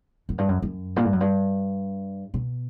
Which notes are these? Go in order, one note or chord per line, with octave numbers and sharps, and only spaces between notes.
F#2
G2
F#2
F#2
A#2
G2
F#2
G2
B2